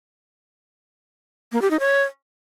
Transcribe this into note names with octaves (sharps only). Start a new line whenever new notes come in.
A#3
G4
D#4
C#5